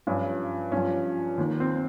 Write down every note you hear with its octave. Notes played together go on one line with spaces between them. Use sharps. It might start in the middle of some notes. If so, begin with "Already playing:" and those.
G2 F3 C#4
G2 F3 C#4
D#2 D#3
C4